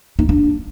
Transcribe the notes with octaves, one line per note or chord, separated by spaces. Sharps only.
D#4
D4